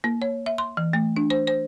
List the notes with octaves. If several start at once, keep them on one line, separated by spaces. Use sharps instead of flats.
A#3
C#5
E5
C6
E3
A3
D4
C5
C5